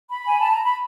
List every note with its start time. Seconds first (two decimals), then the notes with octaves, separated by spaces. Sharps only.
0.10 B5
0.27 G#5
0.39 A5
0.52 A#5
0.64 B5